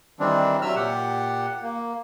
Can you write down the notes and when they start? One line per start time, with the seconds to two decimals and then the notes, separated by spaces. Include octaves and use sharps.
0.20 D#3 E3 G3 C4 D4
0.62 C3 F#3 E5 E6 F6
0.76 A#2 G4 F#5
1.63 A#3